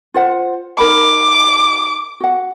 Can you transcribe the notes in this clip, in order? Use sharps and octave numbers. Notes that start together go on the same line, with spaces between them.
F4 C5 F#5
D#4 A#4 B5 D6
F#4 F#5